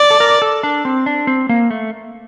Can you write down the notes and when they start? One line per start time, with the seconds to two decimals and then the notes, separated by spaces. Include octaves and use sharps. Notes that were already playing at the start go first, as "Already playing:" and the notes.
Already playing: D5
0.10 A4
0.20 A#4
0.42 A4
0.63 D4
0.85 C4
1.06 D4
1.27 C4
1.49 A#3
1.71 A3